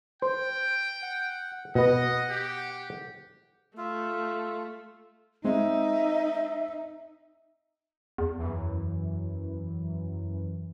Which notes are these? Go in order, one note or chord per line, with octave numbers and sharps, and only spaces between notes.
C5 G5
F#5
B2 B3 D#5 F#5
G4
A3 F4 E5
G#3 C4 D#4 E5
E2
F#2 E3